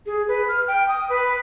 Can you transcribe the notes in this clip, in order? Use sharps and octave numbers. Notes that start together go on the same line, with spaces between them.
G#4
B4
F6
G5
D#6
B4